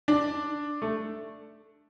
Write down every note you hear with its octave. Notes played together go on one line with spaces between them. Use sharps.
D4
A3